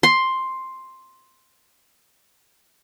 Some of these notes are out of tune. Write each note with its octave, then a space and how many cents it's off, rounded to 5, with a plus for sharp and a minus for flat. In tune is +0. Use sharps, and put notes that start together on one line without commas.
C6 +5